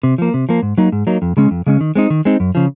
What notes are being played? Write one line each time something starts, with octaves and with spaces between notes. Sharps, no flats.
C3
F3 A#3
C3
F3 A#3
G#2
F#3 A#3 D#4
G#2
F#3 A#3 D#4
F2
C#3 G#3 C#4
F2
C#3 G#3 C#4
D#3
G#3 C4 D#4
D#3
G#3 C4 D#4
F#2
C#3 F3